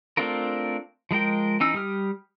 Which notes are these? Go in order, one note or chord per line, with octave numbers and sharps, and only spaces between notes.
A3 C4 D4 F4 A#4
F3 G#3 A#4 G5
E3 C#4 D#4 E6
G3 G4 D#6 F6